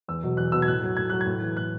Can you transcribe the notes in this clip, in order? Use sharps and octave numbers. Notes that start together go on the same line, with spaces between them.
E2 E6
B2 F#3
E2 F#6
B2 F#3 E6
G#6
A2 F#6
F#3
A2 G#6
F#3 F#6
G#6
A2
E3
A2 F#6